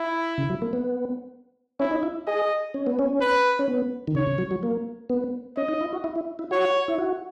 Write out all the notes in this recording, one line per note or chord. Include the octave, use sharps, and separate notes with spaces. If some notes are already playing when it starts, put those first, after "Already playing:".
Already playing: E4
C#3
F#3
A#3
B3
C#4 E4
D#4
E4
G#4 D#5
C#4
B3
C#4
B4
C#4
B3
D#3
C#3 C#5
C#3
F#3
F#3
A#3
B3
C#4 D#5
D#4
E4
F#4
E4
E4
E4
F#4 C#5
E4
F#4